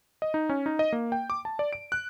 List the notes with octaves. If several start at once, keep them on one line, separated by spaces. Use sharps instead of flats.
D#5
D#4
C#4
D#4
D#5
A#3
G5
D6
A5
D5
D7
F#6